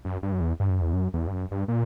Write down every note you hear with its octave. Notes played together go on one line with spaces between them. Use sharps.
F#2
G2
F#2
E2
G2
F#2
E2
F#2
E2
G2
F#2
G2
A#2